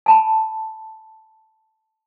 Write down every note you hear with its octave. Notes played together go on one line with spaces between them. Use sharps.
G#5 A5 B5